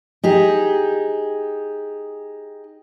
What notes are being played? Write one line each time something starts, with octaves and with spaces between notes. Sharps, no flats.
D#4 G4 G#4